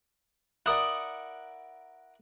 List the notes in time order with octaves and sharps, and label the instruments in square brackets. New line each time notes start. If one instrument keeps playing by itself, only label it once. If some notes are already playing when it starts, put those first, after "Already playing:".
[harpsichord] E4 A#4 D5 [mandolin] F#5 D#6